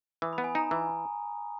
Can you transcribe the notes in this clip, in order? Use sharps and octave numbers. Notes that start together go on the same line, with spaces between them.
E3 D#6
B5
B3
G#5
D#4 A#5
E3 G#5